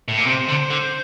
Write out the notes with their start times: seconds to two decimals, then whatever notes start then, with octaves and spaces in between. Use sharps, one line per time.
0.08 A2
0.18 A#2
0.27 C3 C5
0.49 D3
0.71 D3